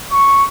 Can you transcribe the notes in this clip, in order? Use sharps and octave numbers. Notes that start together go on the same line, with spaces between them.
C#6